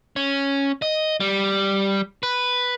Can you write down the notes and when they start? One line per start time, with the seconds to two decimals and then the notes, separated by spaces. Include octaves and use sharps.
0.16 C#4
0.82 D#5
1.20 G3
2.23 B4